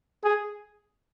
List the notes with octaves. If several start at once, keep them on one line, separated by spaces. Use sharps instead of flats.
G#4